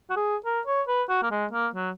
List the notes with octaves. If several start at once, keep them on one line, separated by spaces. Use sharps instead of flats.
F#4
G#4
A#4
C#5
B4
F#4
A#3
G#3
A#3
F#3